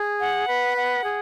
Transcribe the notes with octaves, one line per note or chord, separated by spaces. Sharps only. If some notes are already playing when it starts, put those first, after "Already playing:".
Already playing: G#4
F#5
B4
F#5
G#4